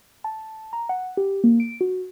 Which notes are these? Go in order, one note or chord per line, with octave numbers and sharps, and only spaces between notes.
A5
A#5
F#5
G4
A#3
D7
F#4